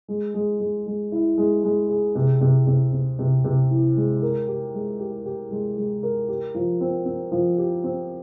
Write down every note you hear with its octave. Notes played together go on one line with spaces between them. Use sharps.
G#3
G#3
G#3
G#3
E4
G#3
G#3
G#4
C3
C3
C3
C3
C3
C3
E3
G#3
A#4
G4
G#3
G4
G4
G#3
G#3
A#4
G4
F3
C4
C4
F3
G4
C4